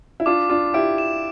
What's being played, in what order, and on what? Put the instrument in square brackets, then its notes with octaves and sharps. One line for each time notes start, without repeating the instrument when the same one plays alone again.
[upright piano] E4
[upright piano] D4 F4 [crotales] D6
[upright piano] D4 F4 [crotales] D6
[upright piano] E4 G4 [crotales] D7
[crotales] E7